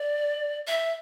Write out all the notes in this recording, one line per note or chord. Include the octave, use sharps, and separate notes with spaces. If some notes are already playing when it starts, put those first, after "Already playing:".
Already playing: D5
E5